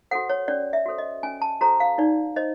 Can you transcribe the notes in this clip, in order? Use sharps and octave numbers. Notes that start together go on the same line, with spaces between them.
F#4 A4 C5 F#5
C#5
C#4 D5
E5
F#4 A4 C5
D#5
C#4 G#5
A5
F#4 A4 C5 A#5
F5
D#4 D5
C5 D#5